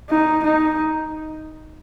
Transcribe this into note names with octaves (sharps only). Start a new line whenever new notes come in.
D#4
D#4